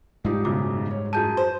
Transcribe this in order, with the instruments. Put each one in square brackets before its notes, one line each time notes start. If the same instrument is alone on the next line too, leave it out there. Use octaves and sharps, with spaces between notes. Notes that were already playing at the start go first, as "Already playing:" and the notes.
[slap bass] G#2 G3 [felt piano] F3 D#4 G4
[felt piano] B1 F#2 C#3 [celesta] D6
[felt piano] C#5
[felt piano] F#2 G#4 D#7 [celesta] A5 G6
[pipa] C5